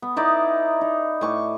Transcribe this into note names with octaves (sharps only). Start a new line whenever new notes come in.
B3
B3 D#4 E4 D5
D#4
A2 C#6 D6